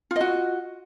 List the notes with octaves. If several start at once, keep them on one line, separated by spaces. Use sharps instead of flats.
F4 F#4 D#5